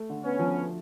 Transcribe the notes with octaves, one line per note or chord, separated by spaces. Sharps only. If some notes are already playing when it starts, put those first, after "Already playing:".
Already playing: A3
D3
B3 C#4
F3